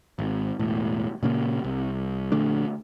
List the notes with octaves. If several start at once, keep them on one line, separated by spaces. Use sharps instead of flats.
G#1
E1 A2
A#2 C#3 A#3
C2
A#1 D3 A3 D4